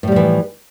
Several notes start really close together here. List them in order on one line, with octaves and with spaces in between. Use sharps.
A2 G3 F3 E3